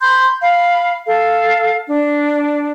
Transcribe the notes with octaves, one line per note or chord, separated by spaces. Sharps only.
B5 C6 G6
F5 B5
A4 F5
D4